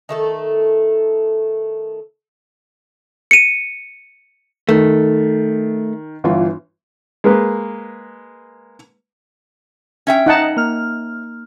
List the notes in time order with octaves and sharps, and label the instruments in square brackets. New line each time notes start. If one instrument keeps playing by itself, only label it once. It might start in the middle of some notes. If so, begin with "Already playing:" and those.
[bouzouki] D#3 A3 A4
[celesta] C#7 D#7
[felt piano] D#3 [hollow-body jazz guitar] A3
[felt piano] G1 E3 F4
[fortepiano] G#3 A#3 B4
[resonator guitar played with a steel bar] C#4 E5 G5
[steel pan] D#4 F#5 A5
[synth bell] A#3 F6